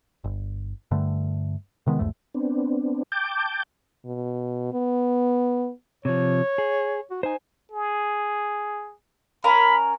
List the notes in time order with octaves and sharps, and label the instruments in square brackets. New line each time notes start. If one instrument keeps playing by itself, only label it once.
[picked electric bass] G1
G2 D3 A3
C3 D#3 G#3 B3
A#1 E2 G#2 A3
[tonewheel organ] B3 C4 D4
G5 A5 D6 G6
[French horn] B2
B3
[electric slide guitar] C3 F3 [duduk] C#5
[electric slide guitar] G#4
[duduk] F#4
[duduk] D#4 [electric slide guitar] C5 G#5
[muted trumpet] G#4
[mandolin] C#4 A#4 F5 [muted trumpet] B5